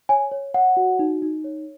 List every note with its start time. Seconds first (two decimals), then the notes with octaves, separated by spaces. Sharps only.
0.09 C#5 G#5
0.32 C#5
0.54 C#5 F#5
0.77 F#4
0.99 D#4
1.22 D#4
1.44 C#5